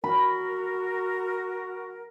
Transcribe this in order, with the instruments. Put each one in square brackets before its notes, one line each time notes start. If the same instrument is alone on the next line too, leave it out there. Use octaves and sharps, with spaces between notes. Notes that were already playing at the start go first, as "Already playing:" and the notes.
[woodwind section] F#4 A#4 [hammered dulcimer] B5